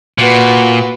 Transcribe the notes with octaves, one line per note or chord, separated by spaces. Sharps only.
A#2 F#4 B4